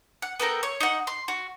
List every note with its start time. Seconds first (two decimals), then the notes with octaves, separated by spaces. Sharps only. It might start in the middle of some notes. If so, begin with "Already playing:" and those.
0.22 F#5
0.40 B3 A4 A#4 G5
0.63 C#5
0.81 D#4 F#5
1.07 C6
1.28 F#4